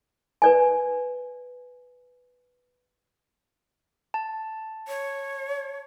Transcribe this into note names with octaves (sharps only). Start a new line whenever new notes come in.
B4 D5 G#5
A5
C#5